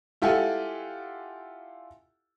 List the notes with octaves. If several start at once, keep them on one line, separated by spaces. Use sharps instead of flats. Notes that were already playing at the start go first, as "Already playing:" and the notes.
E4 F4 G4 A4 F#5 G#5